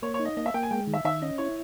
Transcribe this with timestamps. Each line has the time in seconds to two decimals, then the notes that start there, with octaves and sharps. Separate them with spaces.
0.02 A#3 C#5
0.14 C#5
0.19 D#4
0.25 D#5
0.37 A#3 D#5
0.46 E5
0.54 A#3 G5
0.63 G#5
0.71 G#3 G5
0.87 D#3
0.94 E5
1.05 D#3 E5
1.22 C#4 D#5
1.38 E4 C#5